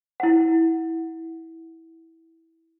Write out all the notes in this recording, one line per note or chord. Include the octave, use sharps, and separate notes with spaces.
E4 F#5